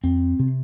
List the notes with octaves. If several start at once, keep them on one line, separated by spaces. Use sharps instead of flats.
F2 C4
C3